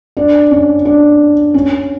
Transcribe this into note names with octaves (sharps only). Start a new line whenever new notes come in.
D4
C#4
D4
C#4